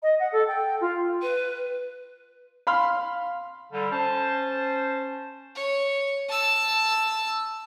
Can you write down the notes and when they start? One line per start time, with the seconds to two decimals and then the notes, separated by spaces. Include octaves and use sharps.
0.03 D#5
0.19 F#5
0.32 A4
0.48 G5
0.81 F4
1.22 B4
2.67 F5 B5 C6 F6
3.72 D3 G3
3.91 C#4 C5 A5
5.55 C#5
6.28 A5 E6